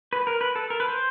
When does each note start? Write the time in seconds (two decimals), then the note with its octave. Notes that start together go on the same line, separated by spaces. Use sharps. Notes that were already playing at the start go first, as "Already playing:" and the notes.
0.13 B4
0.27 A#4
0.41 B4
0.56 A4
0.70 A#4
0.80 B4
0.88 C5